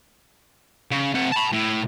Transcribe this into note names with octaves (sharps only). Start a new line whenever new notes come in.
C#3
C3 F#5
A5 B5
A2